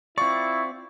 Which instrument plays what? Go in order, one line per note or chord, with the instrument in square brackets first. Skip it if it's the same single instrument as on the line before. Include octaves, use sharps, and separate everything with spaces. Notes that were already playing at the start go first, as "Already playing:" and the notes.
[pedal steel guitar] C4 F4 D5 [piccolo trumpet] E4 [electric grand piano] C#6